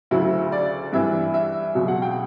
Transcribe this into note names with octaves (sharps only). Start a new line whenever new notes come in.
D2 C#3 F#3 E4
D5
G2 E3 E5
E5
C#2 B2 F#3
F#5
G5